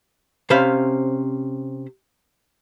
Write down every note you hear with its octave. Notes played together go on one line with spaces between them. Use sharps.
C3 C#4 C5 E5 F5 B5